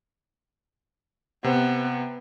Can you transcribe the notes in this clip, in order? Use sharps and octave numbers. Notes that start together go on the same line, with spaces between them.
C3 B3 C5